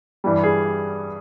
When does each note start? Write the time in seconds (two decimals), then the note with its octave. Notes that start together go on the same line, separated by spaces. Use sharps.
0.24 G2 E3 G3
0.43 G#4